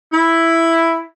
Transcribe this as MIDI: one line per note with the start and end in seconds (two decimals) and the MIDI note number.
0.13 1.02 64